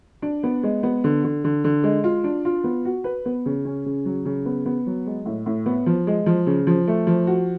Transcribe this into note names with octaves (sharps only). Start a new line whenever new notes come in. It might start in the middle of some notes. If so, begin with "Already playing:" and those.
D4
B3
G#3
B3
D3
D3
D3
D3
G#3
F4
D4
F4
B3
F#4
B4
B3
C#3
C#4
C#3
F#3
C#3
B3
B3
F#3
G#3
A2
A2
B3
F3
G#3
F3
C#3
F3
A3
F3
F#4